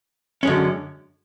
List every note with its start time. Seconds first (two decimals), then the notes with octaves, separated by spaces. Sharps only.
0.43 F#2 D3 G#3 C#4